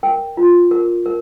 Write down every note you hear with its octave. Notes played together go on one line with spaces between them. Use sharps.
A#4 G5
F4
A#4
A#4